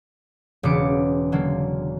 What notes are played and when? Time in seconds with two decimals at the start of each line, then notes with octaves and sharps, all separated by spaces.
0.63 E1 C#3 B4 D6 C#7 D7
1.32 D3 F#3 A#3